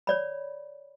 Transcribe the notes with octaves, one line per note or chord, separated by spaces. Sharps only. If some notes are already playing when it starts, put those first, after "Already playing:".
C#5 D5 B5